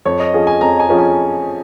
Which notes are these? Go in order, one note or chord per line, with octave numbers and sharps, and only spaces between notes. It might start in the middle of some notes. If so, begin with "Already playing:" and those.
F2 C#5
D#5
F3 C#4 G#4
G#5
F2 A#5
G#5
F3 C#4 G#4
G#5